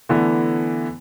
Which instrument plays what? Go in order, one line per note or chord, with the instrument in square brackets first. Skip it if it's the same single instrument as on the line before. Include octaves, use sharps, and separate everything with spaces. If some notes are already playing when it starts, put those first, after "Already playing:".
[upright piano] D3 E3 A3 B3